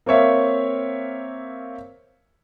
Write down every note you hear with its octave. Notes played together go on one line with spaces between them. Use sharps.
A#3 C4 C#5 E5 F5